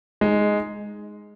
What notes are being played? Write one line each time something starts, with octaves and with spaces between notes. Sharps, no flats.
G#3 D#4